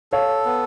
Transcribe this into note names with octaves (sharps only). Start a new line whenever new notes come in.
A4 C#5 F5
B3